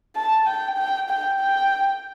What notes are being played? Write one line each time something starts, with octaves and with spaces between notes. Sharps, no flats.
A5
G5
G5
G5
G5